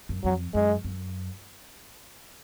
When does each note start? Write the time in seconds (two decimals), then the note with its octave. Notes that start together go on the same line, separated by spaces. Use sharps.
0.09 F#2
0.24 F2 F#3
0.54 F#2 G#3
0.84 F#2